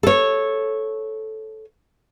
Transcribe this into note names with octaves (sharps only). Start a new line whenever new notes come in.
A4 C#5